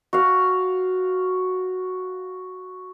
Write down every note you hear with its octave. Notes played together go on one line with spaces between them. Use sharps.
F#4 F5